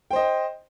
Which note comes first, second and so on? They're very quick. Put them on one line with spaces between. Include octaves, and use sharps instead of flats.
G5 C5 D#5